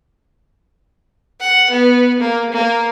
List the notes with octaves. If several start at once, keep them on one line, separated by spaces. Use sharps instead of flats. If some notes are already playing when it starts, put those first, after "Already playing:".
F#5
B3
A#3
A#3